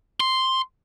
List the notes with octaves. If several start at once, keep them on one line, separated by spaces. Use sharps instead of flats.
C6